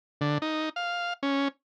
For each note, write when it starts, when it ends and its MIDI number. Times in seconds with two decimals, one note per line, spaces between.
0.21 0.38 50
0.42 0.69 63
0.76 1.13 77
1.23 1.48 61